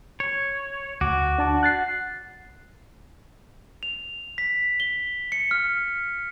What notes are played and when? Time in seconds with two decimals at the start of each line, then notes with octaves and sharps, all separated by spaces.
0.20 C#5
1.01 D2 F#4 D6
1.38 D4 A5 D6
1.63 F#6 A6 C7
3.83 F7
4.38 B6
4.80 G7
5.32 C#7
5.51 F6